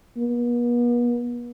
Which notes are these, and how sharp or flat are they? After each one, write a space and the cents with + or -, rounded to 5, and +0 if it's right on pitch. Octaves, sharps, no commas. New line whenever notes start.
B3 -45